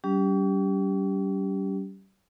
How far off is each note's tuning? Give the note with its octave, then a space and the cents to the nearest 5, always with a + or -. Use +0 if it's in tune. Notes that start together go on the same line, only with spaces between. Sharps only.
G3 -30 C#4 +45 G4 +0